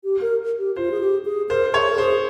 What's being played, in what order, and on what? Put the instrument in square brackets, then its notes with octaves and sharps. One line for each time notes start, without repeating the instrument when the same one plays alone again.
[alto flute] G4
A#4
G4
[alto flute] F4 [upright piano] C5
[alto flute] G#4
G4
G#4
[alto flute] A#4 [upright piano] C5
[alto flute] G#4 [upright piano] C#5
[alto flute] A#4
[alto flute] G#4 [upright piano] C5